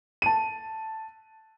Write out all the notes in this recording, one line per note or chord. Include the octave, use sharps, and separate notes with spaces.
A5 D#7